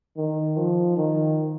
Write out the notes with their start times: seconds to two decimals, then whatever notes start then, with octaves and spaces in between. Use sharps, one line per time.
0.17 D#3
0.57 F3
0.97 D#3